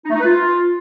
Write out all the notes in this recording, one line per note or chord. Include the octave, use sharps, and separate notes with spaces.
D#4
A3
D#4
B4
F4